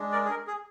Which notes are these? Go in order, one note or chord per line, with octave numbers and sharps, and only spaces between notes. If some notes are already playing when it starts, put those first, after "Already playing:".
Already playing: G#3 D4
A#4 D5
G#4
A#4
G#4